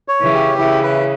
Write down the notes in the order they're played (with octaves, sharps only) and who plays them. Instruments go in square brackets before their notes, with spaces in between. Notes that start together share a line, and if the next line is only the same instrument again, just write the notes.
[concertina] C#5
[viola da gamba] C#3 E3
[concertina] G4
[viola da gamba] C#3 E3 [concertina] E4
[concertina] B4